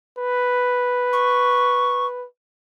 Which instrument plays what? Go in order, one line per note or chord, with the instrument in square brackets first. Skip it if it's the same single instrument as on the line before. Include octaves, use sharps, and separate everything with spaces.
[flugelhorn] B4
[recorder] C#6